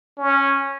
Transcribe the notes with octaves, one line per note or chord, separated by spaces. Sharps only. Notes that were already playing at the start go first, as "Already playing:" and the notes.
C#4